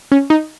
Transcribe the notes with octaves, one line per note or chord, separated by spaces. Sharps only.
C#4
D#4